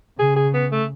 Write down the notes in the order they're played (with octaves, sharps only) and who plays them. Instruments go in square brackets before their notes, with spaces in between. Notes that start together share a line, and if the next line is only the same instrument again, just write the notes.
[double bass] C#3 [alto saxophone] G#4
[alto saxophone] G#4
B3
A3